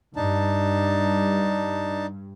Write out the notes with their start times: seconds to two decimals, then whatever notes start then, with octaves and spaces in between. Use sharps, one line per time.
0.16 G2 D4 D#4 A5